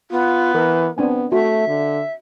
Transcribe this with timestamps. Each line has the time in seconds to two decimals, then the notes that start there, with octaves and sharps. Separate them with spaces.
0.11 B3 F4
0.55 E3 A#4
0.98 B3 C4 D4 G#5
1.32 A3 F#4 E5
1.68 D3